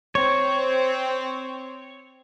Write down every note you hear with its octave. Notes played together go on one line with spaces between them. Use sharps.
C4 C#5